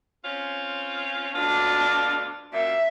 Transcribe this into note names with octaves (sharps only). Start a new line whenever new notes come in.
C4 C#4 F4
D2 B2 D4 F4
F#2 A#2 E5